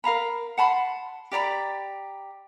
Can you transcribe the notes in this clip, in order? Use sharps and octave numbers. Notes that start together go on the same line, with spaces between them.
A#4 F5 A#5 B5
F#5 A5 B5 C6
G4 D5 A#5 B5